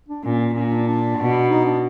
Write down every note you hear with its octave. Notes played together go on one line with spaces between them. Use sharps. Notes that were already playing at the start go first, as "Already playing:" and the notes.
D4
A#2 C#4
A#2 C#4
C#4
D4
D4
B2
D#4
D4